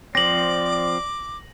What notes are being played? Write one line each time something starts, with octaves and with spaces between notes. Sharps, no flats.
F3 C4 D5 D6 A#6 F#7